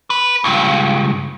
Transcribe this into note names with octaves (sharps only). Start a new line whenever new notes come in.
B4
C#2 G2